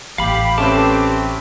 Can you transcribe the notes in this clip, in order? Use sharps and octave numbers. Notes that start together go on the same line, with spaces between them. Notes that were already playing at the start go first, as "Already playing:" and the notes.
A1 G4 F5 B5
A3 C4 C#4 G4 B4 A5 D6